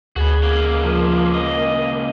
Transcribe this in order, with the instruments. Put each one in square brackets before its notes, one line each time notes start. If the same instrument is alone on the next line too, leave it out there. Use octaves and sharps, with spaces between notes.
[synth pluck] D2 G#4 G#6 [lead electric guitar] F#4 B4
[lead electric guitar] C#2 A#3
[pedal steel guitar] F3
D#5